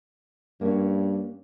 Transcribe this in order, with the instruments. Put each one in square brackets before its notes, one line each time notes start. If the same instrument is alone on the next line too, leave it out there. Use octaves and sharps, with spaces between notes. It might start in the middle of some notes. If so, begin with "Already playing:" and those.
[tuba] G2 [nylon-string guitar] A#3 C#4